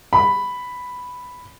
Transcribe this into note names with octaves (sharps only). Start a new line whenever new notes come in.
B5